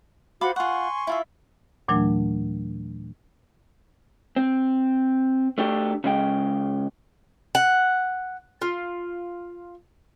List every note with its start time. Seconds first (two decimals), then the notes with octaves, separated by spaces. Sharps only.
0.41 F4 F#4 C5 F#5 B5 D6
0.56 F4 F#5 G#5 C6 C#6
1.07 E4 F4 E5
1.88 D#2 A#2 E3 F#3 A3 D4
4.36 C4
5.58 A3 D4 G4
6.04 C#3 G#3 G5
7.55 F#5
8.62 F4